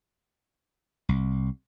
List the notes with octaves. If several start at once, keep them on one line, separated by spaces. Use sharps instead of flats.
C2